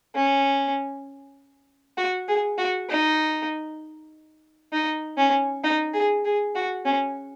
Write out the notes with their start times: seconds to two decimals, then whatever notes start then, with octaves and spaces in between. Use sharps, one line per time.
0.15 C#4
1.97 F#4
2.28 G#4
2.58 F#4
2.89 D#4
4.73 D#4
5.18 C#4
5.64 D#4
5.93 G#4
6.25 G#4
6.55 F#4
6.85 C#4